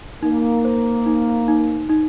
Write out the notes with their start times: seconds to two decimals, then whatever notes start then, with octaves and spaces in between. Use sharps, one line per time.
0.22 A#3 D#4
0.65 C5
1.06 D#4
1.48 D#4
1.89 D#4